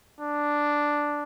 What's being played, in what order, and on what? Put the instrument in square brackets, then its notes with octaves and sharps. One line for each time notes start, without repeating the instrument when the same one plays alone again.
[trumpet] D4